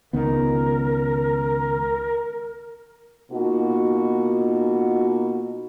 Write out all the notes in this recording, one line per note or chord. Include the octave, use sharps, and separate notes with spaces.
C#2 D#3 B3 A#4
B2 A#3 D#4 F4 F#4